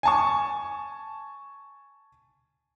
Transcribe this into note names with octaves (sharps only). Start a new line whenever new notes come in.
G#5 A5 C#6